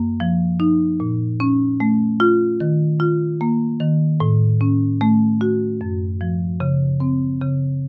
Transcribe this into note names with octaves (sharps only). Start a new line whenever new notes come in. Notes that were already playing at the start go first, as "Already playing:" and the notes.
Already playing: F#2 A#3
F3
D#4
A#2
C#4
A3
F4
D#3
F4
A#3
D#3
A2
C#4
A3
F#4
F#2
F3
C#3
C4
C#3